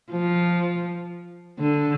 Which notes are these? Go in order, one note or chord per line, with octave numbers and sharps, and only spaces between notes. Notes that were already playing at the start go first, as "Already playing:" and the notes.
F3
D3